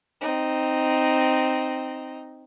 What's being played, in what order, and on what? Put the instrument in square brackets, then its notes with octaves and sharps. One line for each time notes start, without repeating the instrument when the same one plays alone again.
[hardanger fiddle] C4 D#4